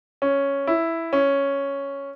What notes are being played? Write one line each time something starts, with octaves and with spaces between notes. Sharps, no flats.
C#4
E4
C#4